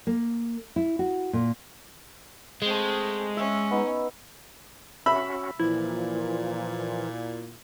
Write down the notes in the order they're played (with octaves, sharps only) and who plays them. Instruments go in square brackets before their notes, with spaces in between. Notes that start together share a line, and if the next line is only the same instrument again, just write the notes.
[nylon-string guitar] A#3
E4
F#4
A#2
[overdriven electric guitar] G#3 [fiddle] A3 C4
[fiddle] C#4 [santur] E5
[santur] B3 D#4
[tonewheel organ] C#4 F#4 [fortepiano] E5 B5
[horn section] A#2 [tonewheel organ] E3 F3 [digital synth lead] E4